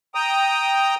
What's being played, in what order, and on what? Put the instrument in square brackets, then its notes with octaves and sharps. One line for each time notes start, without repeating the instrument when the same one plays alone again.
[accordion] G5 A#5 D#6